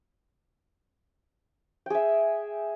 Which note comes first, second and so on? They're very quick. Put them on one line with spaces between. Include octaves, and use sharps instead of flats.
G5 G#4 E5